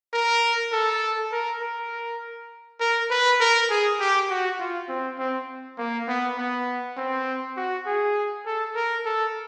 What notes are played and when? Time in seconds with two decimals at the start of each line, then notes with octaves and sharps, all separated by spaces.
0.13 A#4
0.72 A4
1.32 A#4
1.62 A#4
2.80 A#4
3.10 B4
3.40 A#4
3.70 G#4
4.00 G4
4.30 F#4
4.59 F4
4.89 C4
5.19 C4
5.78 A#3
6.08 B3
6.38 B3
6.97 C4
7.57 F#4
7.86 G#4
8.46 A4
8.75 A#4
9.05 A4